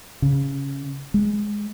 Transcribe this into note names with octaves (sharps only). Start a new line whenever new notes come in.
C#3
G#3